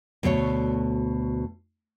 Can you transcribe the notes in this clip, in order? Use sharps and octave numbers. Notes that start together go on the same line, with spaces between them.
D2 B2 A3 C#5